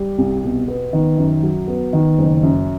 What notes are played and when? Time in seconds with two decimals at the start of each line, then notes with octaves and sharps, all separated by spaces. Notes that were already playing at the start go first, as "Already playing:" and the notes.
Already playing: G3
0.18 C2
0.44 B2
0.68 B3
0.93 D#3
1.17 F#2
1.43 F#3
1.68 B3
1.93 D#3
2.18 F#1
2.43 F#2